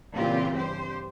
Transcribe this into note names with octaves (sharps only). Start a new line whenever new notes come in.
A#2 C#3 E3 C4 F4 G4
G2 G4 C5